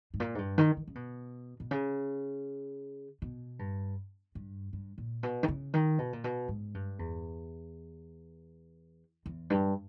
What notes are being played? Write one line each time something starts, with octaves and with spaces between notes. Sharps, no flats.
G#2
A#2
G#2
G2
D#3
D#3
C#3
B2
B2
C#3
B2
G2
G2
G2
A#2
B2
D#3
C#3
D#3
B2
A#2
B2
G#2
G2
E2
E2
G2